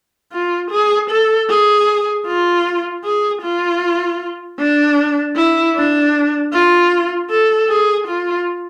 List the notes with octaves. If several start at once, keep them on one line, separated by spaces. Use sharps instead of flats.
F4
G#4
A4
G#4
F4
G#4
F4
D4
E4
D4
F4
A4
G#4
F4